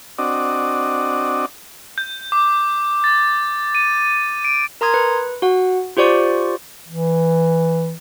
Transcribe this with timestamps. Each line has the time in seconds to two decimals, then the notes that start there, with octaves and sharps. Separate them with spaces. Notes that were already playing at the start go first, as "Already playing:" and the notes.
0.18 C4 D4 F#4 D5 D#5
1.98 G6
2.32 D6
3.04 A6
3.75 D#7
4.44 D7
4.81 A#4 A#5 C6 D#6 G#6
4.94 B4
5.42 F#4 F#5
5.97 F4 G4 C5 D5 C#6
6.88 E3